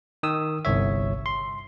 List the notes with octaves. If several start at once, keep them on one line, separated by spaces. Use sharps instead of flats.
D#3 D#6 E6
G1 C2 C#5 E5
C6